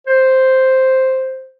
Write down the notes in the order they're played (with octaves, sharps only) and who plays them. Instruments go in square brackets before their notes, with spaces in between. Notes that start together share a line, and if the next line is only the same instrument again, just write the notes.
[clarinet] C5